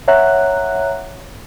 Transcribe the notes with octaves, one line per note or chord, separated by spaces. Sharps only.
C#5 E5 F#5 A#5 F#6